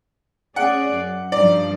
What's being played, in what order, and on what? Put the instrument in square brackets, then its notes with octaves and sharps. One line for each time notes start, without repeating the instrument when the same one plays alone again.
[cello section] C#4 G#4 D5 [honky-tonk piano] F#5
[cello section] F#2
[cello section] G2 F3 D#4 [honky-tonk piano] D5